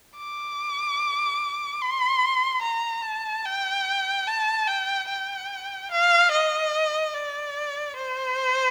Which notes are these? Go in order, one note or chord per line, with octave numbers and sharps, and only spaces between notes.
D6
C6
A#5
A5
G5
A5
G5
G5
F5
D#5
D5
C5